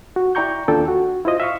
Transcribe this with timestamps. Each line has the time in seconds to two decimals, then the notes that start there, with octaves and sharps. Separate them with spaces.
0.16 F#4
0.35 E4 D5 G5 A#5 C#6 G6
0.68 D#2 D4 F4 A4 G5
0.88 F#4
1.25 E4 F4 C5 D#5
1.40 E5 F5 C#6